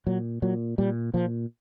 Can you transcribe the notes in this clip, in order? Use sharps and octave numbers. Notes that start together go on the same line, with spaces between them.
A#2 F#3
A#2 F#3
A#2 G3
A#2 F3